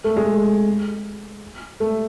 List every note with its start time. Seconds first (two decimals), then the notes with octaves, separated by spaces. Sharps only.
0.04 A3
0.17 G#3
1.80 A3